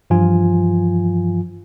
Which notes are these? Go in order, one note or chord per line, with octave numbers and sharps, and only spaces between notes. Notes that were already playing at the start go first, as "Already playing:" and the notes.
G2 E3 F3 F4 G#5